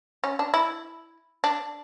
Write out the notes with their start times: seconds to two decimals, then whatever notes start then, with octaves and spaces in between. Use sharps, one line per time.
0.24 C#4
0.39 D4
0.54 E4
1.44 D4